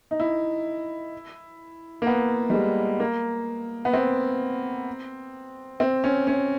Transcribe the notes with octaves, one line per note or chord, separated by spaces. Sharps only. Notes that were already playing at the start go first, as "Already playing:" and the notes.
D#4
E4
A#3
B3
G3
G#3
A#3
B3
C4
C4
C#4
C#4